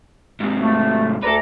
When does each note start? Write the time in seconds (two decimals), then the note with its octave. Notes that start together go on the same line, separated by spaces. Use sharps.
0.40 G#2 C3
0.61 A3
1.23 D2 A4 B4 D5 A#5